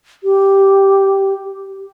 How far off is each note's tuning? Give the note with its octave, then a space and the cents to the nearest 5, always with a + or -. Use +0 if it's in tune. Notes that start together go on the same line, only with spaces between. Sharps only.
G4 -5